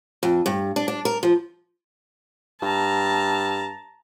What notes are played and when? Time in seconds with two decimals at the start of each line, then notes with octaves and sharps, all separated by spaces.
0.23 F2
0.46 G2
0.76 D4
0.88 D4
1.05 A#4
1.23 F3
2.62 G2 A5 A#5